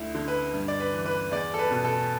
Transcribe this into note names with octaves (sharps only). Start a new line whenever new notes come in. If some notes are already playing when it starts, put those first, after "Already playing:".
Already playing: D2 E4
D3
B4
G2
D5
B4
E3
B4
E2 D5
A4
B4
B2
A4